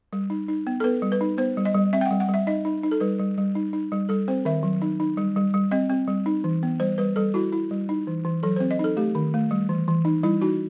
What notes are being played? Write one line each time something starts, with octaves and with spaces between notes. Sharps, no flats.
G3
D#4
D#4
B3
A4
B3 B4
G3
B4
D#4
B3 C5
G3
D#5
G3
C4 E5
G5
F#5
G3
F#5
G3
E5
D#4 D#5
D#4
D#4
A4
G3 B4
G3
G3
D#4
D#4
G3
G3 A4
C4 C5
D#3 E5
F#3
D#4
D#4
G3
G3
G3
C4 D#5
C4
G3
D#4
E3
B3
G3 C5
G3 B4
G3 A4
E4 F#4
E4
G3
D#4
E3
E3
F#3 A4
C4 C5
D#5
D#4 A4
A3 G4
D#3
A3
G3
E3
E3
D#4
G3 E4
D#4 F#4